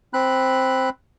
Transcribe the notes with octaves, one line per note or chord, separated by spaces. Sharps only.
C4 B5 F#6